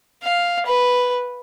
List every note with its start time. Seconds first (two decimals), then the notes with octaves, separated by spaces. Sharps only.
0.23 F5
0.66 B4